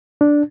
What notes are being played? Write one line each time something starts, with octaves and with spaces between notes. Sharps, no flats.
D4